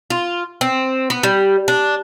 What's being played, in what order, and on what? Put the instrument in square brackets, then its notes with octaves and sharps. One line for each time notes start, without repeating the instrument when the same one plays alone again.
[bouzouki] F4
C4
B3
G3
D4